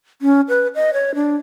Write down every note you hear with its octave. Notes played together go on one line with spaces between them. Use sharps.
C#4
B4
D#5
C#5
D4